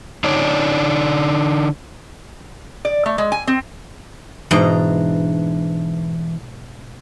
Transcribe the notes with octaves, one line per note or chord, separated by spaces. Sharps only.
D3 D4 D#4 C#5 D5
D5
A3
G#3
G#5
C4
G#2 B2 E3 D4 D#5 A#5